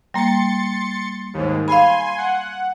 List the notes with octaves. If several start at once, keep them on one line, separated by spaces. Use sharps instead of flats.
G3 A#3 C6 A6 C#7
D#2 G#2
F5 G#5 B5 C6
F#5